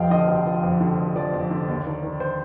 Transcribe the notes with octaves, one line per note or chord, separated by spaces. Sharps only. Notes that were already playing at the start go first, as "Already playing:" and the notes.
Already playing: F1 F2 F3 D#5 F5 G5
D3 D#5
F1
F3
F2
D3
F1
F3 D5
F2
D3
D#2
D#3
D#3
C5